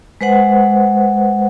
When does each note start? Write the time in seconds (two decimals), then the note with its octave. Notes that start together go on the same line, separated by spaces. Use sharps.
0.21 G#3 B4 C5 F#5